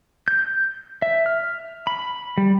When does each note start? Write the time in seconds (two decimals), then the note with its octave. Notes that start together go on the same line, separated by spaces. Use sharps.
0.28 G6
1.02 E5
1.26 F6
1.87 B5
2.38 G3